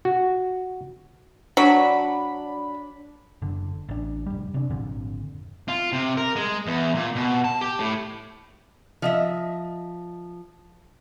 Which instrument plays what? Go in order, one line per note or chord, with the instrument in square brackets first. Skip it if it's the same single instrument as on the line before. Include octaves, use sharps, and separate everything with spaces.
[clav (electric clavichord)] F#4
[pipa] F#3 [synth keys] D4 B5
[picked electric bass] F#1 D3
A1 D4
F1 G3
C3 D4
G#1 F2 A#2 D3
[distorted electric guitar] F4
C3
A#4
G#3
E2
A#2
B2
A5
G4
A2
[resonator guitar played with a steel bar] F3 D#5 E5